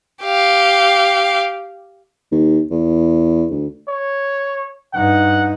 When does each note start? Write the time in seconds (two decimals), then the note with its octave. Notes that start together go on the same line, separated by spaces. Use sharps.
0.23 G4 F5
2.32 D#2
2.70 E2
3.50 D2
3.88 C#5
4.94 G2 D#4 F#5